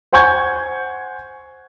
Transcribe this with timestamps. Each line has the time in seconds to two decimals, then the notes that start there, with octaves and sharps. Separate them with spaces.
0.12 C5 F#5 G#5 C#6 G6 G#6